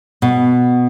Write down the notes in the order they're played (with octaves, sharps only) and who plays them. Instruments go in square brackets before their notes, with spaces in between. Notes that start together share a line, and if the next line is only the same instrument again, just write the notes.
[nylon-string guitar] B2